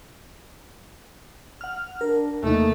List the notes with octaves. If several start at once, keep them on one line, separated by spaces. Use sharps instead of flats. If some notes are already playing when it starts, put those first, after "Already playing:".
F#5 F6
D4 A#4
E2 C3 A3 A#3 D#4